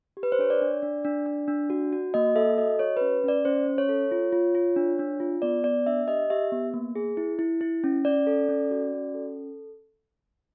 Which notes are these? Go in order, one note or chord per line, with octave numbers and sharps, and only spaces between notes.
G4
B4
C5
D4 C#5
D5
D4
D4
D4
D4
D4
F#4
F#4
A#3 D#5
A4 E5
F#4 D#5
F#4 C#5
C#4 B4
C#4 D5
C#4 C5
C#4
C#5
A4
F4
F4
F4
D4
D4
F4
B3 D5
B3 D5
D4 E5
G4 D#5
G4 E5
B3
A#3
G#4
E4
E4
E4
C#4
C#4 D5
A4
C#4
F#4
C#4
A4